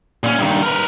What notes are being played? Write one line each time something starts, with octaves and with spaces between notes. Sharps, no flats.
A#2 C#4
G2 D#3
A#4 B4